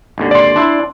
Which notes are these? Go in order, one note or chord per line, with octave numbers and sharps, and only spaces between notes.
G#1 D#2 D3
D5 C6
D4 E4